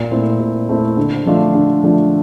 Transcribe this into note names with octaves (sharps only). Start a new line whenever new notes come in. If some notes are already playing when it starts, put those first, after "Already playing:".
Already playing: A#2
A3 C4 E4
A#2
A3 C4 E4
D3
F3 A3 D4 F4
D3
F3 A3 D4 F4